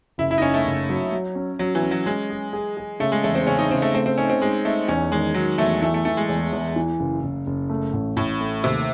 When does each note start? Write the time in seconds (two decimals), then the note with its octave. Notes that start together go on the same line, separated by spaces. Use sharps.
0.18 F#1 E4
0.31 E4
0.38 D#4
0.42 F#1 C#4
0.54 A3
0.65 F#1
0.89 F#3
1.12 F#3
1.35 C#4
1.59 F#3 C#4
1.75 E3
1.82 C#4
1.91 F#3
2.06 G#3 C#4
2.30 G#4
2.53 G#4
2.77 G#4
3.00 C#3 A3
3.12 G#3
3.24 E2 A3
3.35 C4
3.47 C#3 C#4
3.59 D#4
3.71 C#3 C4
3.82 A3
3.94 A3 C4
4.06 C4
4.17 C#4 D#4
4.30 C4
4.41 G#3 D#4
4.65 A3 D#4
4.88 E2 C#4
5.11 D#3 G#3
5.34 D#3 F#3
5.58 E2 A3
5.82 E3 A3
5.94 A3
6.05 E3 A3
6.17 G#3
6.29 E2
6.53 E2
6.76 E3
6.99 F#1
7.23 F#1
7.47 F#1
7.70 A3
7.93 A1
8.17 A1 A2
8.40 A3
8.64 D#2 C3